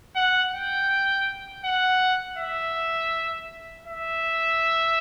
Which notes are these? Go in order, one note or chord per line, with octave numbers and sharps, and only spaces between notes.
F#5
G5
F#5
E5
E5